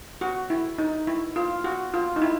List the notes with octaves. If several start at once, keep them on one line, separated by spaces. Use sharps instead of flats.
F#4
E4
D#4
E4
F4
F#4
F4
D#4
E4